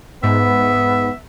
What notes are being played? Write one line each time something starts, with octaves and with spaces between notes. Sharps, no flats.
G#2 B3 E5